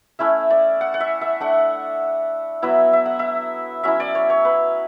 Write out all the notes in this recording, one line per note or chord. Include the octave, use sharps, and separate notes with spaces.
A3 C#4 E4 E5
D5
F#5
F#5
E5
E5
A3 D4 F#5
F#3 B3 E4 E5
E5
F#5
E5
F#3 C#4 E4 E5
D5
C#5
C#5
B4